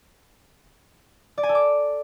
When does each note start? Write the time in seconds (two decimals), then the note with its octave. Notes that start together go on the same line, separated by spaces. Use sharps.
1.38 D5
1.43 G#5
1.49 A4
1.55 D6